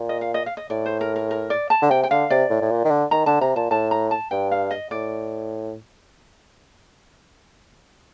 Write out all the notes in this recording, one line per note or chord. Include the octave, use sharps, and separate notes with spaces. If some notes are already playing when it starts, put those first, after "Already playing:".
Already playing: A#2
D#5
F5
D#5
F5
D#5
A2 D5
C5
A#4
A#4
A#4
D5
A5
D3
C3 G5
G5
D3 F5
C3 D5
A2
A2
A#2
D#3
D3
D#3 A#5
D3 A5
C3 A#5
A#2 A5
A2 A5
A#5
A5
G2 G5
F5
D#5
A2 D5